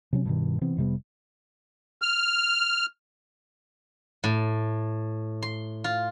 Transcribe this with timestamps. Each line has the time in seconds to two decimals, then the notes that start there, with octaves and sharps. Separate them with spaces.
0.13 C3 F#3 C#4
0.25 G2 B2 D#3
0.61 C3 E3 B3 C4
0.77 F1 C3 G3 B3
2.02 F6
4.24 A2
5.42 C6
5.84 F4